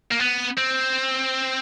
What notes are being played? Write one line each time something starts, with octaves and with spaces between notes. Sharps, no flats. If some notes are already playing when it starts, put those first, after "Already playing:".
A#3
B3
C4